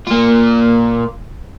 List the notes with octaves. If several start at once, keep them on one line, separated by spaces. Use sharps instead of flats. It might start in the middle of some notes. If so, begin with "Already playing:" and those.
A#3 F4